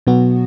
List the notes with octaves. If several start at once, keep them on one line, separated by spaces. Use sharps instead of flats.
B2 F#3 B3 F#4